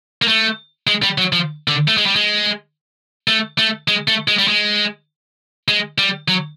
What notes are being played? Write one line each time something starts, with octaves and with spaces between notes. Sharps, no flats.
A#3
A3
G#3
G3
F#3
F3
D3
A3
G#3
G3
G#3
A3
A3
G#3
A3
G#3
G3
G#3
G#3
G3
F#3